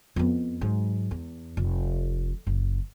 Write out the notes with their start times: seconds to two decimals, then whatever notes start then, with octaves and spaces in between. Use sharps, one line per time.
0.16 F2 B3
0.61 G#2 F#3
1.11 E2
1.57 F1
2.47 F#1